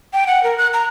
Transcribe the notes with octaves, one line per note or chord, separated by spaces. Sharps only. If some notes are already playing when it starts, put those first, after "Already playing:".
G5
F#5
A#4
F#6
A#5